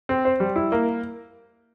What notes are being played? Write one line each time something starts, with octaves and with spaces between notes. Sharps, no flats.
C4
C5
G3
E4
A#3